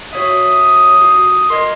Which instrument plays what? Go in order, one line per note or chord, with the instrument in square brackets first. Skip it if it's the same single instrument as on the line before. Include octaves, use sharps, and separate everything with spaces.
[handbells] F#4 C#5 E5 [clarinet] D#6
[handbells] F#4
[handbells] A#4 D#5 G#6 [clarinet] C6